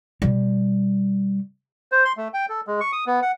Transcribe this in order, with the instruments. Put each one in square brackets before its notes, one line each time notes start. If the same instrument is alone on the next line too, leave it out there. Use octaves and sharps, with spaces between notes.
[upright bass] B2 G3
[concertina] C5
C6
A3
G5
A4
G#3
C#6
D#6
B3
F#5